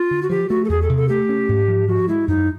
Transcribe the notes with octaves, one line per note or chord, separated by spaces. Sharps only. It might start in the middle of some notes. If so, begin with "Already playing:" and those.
Already playing: F4
D3
F#4
F3 G4
A3 F#4
A4
E2 G#4
A4
C3
A4
A3 G4
C#4
G#2
F3
F3 F#4
G#3 E4
F#2 D#4